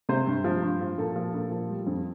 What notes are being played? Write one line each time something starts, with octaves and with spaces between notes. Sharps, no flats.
C3 C5
G2
F3
G2
F3
A#2 A4
F3
A#2
F3
G3
F2